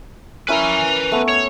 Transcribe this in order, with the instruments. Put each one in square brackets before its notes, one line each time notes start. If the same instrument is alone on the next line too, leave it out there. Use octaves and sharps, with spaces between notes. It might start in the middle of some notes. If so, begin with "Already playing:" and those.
[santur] C#4 E4 A#4 [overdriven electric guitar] B4 G#5
[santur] A3 B3 C#6
[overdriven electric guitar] C#5